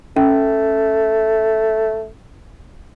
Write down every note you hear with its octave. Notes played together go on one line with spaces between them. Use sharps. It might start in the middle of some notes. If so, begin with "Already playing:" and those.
A3 C#4